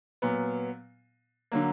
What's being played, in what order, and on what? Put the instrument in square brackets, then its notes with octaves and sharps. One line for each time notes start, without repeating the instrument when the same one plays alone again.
[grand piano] A#2 F#3 B3
D3 F#3 A#3